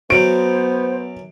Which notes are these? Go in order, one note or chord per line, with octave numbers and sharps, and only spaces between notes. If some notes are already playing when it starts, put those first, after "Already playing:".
F#2 F#3 B3 C5 D7